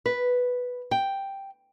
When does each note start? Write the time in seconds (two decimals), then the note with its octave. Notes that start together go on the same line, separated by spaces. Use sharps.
0.06 B4
0.91 G5